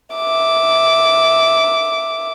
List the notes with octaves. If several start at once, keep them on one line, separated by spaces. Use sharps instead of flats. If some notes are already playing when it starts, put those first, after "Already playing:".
E5 D6